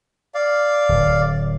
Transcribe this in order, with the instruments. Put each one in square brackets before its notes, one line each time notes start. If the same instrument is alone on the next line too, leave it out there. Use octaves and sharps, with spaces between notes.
[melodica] D5 F5
[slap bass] D1